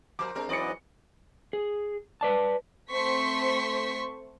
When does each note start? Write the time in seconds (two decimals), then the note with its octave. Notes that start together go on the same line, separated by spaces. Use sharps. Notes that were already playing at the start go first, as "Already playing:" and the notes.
0.19 F3 A#4 C5 D6
0.35 G#3 C4 D4 A#4
0.49 G#2 E3 F#3 C4 B4 D5 D#5 C#7
1.53 G#4
2.21 B4 D5 A5
2.92 A3 C4 C5 C6 C#6 B6